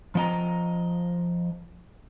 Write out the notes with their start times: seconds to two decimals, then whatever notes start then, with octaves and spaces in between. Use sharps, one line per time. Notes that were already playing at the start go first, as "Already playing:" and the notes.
0.15 F3 D#5 A#5